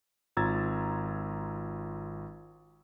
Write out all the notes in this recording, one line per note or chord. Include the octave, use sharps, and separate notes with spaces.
G#1 F4 A#5 E6 G#6 A6